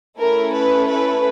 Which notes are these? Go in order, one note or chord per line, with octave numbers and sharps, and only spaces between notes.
A3 C#4 E4 A4 A#4
B4
B4